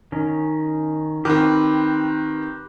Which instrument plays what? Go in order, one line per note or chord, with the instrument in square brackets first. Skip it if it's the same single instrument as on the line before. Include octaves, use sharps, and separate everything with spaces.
[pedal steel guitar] D#3 C#4
[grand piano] D#3 C4 [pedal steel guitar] G4 B4 C5